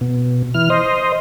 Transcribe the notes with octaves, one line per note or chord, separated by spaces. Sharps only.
B2
E3 F6
C5 D#5